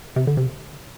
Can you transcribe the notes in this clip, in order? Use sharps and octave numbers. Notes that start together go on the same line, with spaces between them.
C3
D3
C3